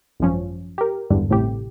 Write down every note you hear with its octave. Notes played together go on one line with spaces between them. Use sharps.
G#1 F#2 F3 C#4
G4 A#4
G#1 E2 G2 D3 G3
A1 A2 C3 G4